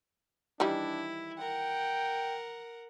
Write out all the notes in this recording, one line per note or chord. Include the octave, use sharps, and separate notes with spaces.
D#3 E3 G3 D4 E4
A#4 F#5 G5